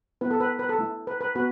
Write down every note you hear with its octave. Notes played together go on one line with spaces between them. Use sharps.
B3 E4 B4
A4
B4
B4
A4
A3 E4
B4
B4
B3 F#4 B4